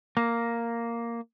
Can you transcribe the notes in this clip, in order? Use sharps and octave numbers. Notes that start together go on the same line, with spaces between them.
A#3